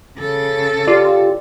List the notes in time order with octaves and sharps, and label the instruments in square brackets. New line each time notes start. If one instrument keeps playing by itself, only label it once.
[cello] C#3 A4
[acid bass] F4 [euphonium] G4 [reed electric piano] D5